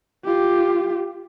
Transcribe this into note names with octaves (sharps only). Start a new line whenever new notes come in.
F4 G4